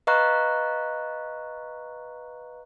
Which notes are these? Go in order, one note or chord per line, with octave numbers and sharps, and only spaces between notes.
B4 D#5 F5 A#5 C#6 F#6